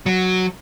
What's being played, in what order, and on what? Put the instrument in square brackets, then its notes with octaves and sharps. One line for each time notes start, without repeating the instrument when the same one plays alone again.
[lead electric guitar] F#3